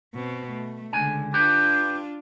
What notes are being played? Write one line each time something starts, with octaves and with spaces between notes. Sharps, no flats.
B2 C4
A3
C#2 D3 G#5
D4 F4 G4 B4